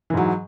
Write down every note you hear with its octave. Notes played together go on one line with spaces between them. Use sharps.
G#2 E3 F#3